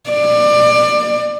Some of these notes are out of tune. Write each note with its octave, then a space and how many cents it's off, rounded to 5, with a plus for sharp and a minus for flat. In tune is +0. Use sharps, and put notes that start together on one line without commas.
D5 +25